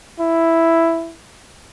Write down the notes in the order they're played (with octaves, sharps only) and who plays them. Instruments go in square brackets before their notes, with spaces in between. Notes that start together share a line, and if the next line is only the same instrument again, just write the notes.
[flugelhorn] E4